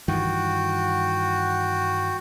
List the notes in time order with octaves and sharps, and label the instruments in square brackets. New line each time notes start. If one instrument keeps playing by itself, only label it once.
[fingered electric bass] G2 D#3 E3 [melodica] F#4 G5